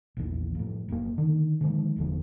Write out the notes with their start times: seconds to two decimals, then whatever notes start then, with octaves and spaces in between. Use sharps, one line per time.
0.17 A#1 E2
0.55 F2 A2
0.89 F1 F#2 A2 A#3
1.18 D3 D#3
1.61 D3 D#3 F3 G#3
1.97 F#1 E2 D3 F3